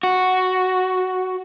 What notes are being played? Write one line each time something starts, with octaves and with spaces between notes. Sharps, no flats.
F#4